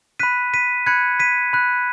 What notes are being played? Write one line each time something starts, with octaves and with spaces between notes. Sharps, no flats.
B5 F#6 B6 D#7
B6 D#7
B5 F#6 G#6 C#7
B6 D#7
B5 F#6